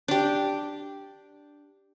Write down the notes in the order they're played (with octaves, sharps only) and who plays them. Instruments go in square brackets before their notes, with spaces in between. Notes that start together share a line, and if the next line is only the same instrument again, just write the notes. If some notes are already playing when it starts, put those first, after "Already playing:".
[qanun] D4 G4